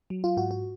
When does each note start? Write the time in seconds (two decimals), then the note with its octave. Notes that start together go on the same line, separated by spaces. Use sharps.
0.10 F#3
0.24 F4
0.37 G#2 F#4
0.51 F#4